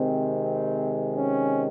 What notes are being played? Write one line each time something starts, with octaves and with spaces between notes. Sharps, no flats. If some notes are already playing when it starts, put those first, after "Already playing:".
Already playing: C3 D#3 G#3 C4
C4
C#4